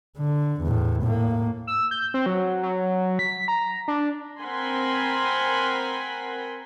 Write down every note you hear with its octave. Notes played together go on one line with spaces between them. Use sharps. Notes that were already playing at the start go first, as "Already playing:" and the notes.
D3
E2 A2
A2 A#3
E6
G6
C4
F#3
F#3
B6
A#5
D4
C4 A#4 F#5 G#5 B5 C6